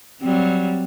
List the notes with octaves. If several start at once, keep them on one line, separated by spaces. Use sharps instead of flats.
F#3 G3 C4